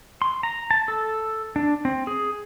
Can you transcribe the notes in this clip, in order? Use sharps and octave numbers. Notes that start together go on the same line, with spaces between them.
C6
A#5
A5
A4
D4
C4
G#4